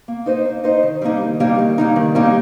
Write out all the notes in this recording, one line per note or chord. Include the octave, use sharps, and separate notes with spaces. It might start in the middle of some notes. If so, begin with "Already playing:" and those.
A#3
D#4 C5 D#5
A#3
D#4 C5 D#5
D#3
G3 A#3 D#4
D#3
G3 A#3 D#4
D#3
G3 A#3 D#4
D#3
G3 A#3 D#4